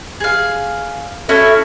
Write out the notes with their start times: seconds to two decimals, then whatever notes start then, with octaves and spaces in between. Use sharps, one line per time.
0.20 G#4 F5
1.29 C#4 E4 F#4 A4